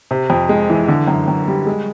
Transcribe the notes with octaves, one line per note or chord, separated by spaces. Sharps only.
C3
F2
G#3
E3
D3
F#2
F#2
G3
G#3